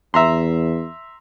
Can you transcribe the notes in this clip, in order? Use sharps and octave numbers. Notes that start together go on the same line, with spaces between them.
E2 E5 A#5 C6